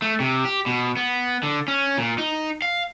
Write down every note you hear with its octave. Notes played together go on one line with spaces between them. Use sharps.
A3
C3
G4
B2
B3
D3
C#4
A#2
D#4
F5